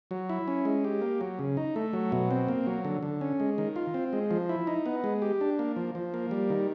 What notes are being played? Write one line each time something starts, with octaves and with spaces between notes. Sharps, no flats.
F#3
E4
C#4
G#3
G4
A#3
F#3
C#3
D#4
A3
F#3
B2
C4
A#3
F#3
D3
D3
C#4
G#3
D#3
F4
C4
G#3
F3
E4
D#4
B3
G#3
G4
D4
A#3
F3
F3
A#3
G3
D#3